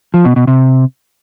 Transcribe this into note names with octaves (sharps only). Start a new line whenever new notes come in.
F3
B2
B2
C3